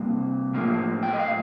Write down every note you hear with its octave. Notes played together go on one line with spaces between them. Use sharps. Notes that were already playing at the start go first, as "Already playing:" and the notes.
Already playing: C3 G3 A#3
A2 F3 A#3
G5
D#5
F5